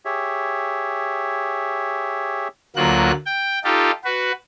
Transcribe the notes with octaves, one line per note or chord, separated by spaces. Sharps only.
G4 G#4 C#5 E5
D2 F#3 A#3 F4 F#6
G5
D#4 F4 G4 A4
F#4 B4